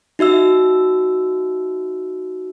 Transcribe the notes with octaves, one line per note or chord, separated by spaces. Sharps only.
D#4 F#4 E5 E6